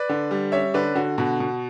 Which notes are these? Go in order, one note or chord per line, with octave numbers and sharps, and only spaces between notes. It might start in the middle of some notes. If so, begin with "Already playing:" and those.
Already playing: B4 D5
D3
G3
C#4 C#5 E5
D3 B4 D5
D3 F#4
B2 F#4
B2